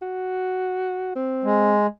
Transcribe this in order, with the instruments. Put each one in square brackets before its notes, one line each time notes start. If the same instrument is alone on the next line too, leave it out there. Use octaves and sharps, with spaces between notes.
[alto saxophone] F#4
C4
[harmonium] G#3